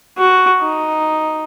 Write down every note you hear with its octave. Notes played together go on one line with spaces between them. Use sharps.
F#4
D#4